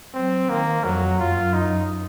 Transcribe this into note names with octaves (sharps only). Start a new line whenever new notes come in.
F#3 C4
D#3 A#3
F2 F#3
F#2 F4
D#4